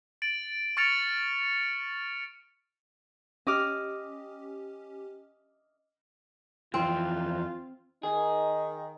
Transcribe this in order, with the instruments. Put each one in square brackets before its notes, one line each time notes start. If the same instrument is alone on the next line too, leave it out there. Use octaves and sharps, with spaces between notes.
[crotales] A6 D7 F#7
C#6 F6 A6 C#7 D7 F7
[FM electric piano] C#4 G4 [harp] D#5 D6 F6
[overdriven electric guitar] F2 E3 [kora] C4 [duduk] F4
[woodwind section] D#3 [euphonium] D#4 [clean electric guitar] G#4